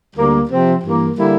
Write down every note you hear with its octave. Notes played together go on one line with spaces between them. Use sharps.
D2 D3 G3 A#3
C3 F3 C4
G2 E3 A#3
D3 G3 A#3 E4